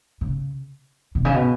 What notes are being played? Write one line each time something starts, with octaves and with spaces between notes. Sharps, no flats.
C#3
B2
C#3
B2